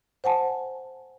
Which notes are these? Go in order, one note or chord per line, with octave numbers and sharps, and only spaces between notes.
C5 F#5 G#5 A5